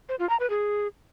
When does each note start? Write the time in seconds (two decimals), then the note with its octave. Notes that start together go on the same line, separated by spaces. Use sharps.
0.09 C5
0.19 F4
0.29 A#5
0.40 B4
0.50 G#4